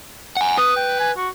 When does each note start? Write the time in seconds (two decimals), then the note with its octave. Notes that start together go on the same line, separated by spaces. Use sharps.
0.37 F#5 G#5
0.58 B4 D#6
0.77 G5
1.00 G#5
1.17 F#4